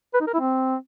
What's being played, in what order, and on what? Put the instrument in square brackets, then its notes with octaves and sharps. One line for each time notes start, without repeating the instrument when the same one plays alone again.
[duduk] B4
D#4
A#4
E4
C4